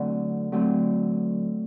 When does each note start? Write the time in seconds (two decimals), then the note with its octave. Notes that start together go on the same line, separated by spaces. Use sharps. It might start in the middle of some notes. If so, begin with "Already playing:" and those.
Already playing: D3 F#3 A3 C4
0.52 D3 F#3 A3 C4